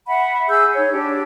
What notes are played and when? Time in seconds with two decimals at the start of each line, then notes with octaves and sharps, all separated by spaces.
0.07 E5 F#5 B5
0.48 G#4 E6 G6
0.75 D#4 C#5
0.91 D4 G4